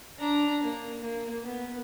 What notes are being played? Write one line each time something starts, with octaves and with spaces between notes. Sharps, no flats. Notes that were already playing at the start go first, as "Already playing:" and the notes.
D4 A#5
A#3
A#3
B3